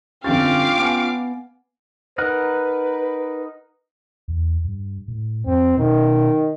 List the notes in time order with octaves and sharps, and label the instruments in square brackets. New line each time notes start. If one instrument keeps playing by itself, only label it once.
[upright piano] G1 F2 A6 [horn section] C#4 F4 G5 [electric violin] F5 D6
[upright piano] B3 G#5
[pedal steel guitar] D#4 A#4 F#5 [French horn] B4
[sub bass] E2
G2
A2
[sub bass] F2 [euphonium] C4
[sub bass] B2 [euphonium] D#3